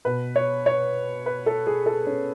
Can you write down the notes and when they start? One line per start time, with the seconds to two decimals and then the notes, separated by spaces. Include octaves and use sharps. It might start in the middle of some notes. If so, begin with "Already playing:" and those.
0.05 B2 B4
0.36 C#5
0.66 C#5
1.26 B4
1.46 A4
1.67 G#4
1.86 A4
2.07 C#4